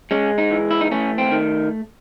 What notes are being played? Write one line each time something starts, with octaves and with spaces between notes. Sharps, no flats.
G#3 C#4
D#4
E3
E4
D#4
A3 C#4
C4
D#3